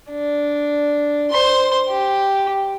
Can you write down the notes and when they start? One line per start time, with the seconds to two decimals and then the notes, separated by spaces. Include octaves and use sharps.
0.11 D4
1.31 C5 C6
1.89 G4